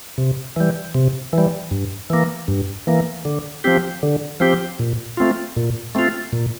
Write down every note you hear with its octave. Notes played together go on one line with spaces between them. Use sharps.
C3
E3 G3
C3
E3
G3
G2
E3 A#3
G2
E3 A#3
D3
F3 C4 G4
D3
F3 C4 G4
A#2
A3 C4 F4
A#2
A3 C4 F4
A#2